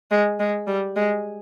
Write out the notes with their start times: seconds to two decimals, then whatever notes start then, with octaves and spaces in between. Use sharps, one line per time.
0.11 G#3
0.40 G#3
0.67 G3
0.96 G#3